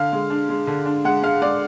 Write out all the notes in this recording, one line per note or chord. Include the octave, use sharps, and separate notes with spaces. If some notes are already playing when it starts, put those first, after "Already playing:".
Already playing: D3 F5
G#3
D4
G#3
D3
D4
G#3 F#5
G#3 F5
G#3 D5